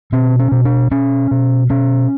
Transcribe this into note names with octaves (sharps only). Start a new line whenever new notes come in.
B2 C4
C#4
B2
D4
B2 C#4
B2
B2 C#4